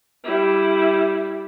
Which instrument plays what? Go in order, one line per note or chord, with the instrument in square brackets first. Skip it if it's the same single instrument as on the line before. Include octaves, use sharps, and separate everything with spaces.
[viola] G3 E4